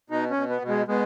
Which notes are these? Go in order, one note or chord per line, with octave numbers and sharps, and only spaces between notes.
B2 D#4
C#4
B2
B3
B2
G#3
B2 G#3